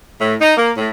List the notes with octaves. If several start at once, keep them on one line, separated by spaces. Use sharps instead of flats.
A2
D#4
A#3
A2